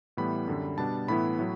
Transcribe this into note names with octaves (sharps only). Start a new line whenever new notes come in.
A2 E3 G3 B3 B5
F#2 D3 G3
B2 G3 B3 D4 A5
A2 E3 B3 E4 B5
A2 F#3